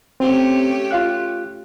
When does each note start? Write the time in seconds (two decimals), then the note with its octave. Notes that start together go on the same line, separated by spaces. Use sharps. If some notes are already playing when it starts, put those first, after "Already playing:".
0.20 A3 C4 C#4 G4
0.91 F4 F5 F#6